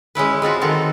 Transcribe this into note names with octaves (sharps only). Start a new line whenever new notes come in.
G#3 C#4 E4 B4
G#3 C4 F4 F#4
D#3 F3 F#4 A4